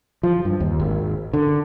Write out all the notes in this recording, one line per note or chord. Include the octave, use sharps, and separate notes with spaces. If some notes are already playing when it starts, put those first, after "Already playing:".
F3
G2
D#2
G#1
D3